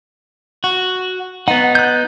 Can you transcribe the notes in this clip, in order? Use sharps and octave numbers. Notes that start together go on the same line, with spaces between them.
F#4
B3 D#4 F#5
F#6 G6